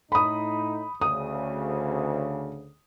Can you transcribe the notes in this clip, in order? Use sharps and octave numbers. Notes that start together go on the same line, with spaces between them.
A2 D#4 B5 D#6
D2 C#3 D#6